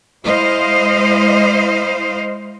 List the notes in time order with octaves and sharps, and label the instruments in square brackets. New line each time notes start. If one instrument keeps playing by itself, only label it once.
[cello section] G#3 E4 C5 D#5 F5